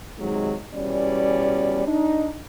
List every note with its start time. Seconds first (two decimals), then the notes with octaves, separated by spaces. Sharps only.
0.18 C3 D#3 F#3 G#3
0.74 E2 B2 G3 C#4 D5
1.86 D4 D#4